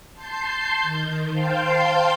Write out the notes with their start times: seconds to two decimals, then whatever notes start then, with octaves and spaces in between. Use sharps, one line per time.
0.13 A5 C6 G6 C7
0.82 D#3
1.31 C5 F5 G5 A5 C6 G6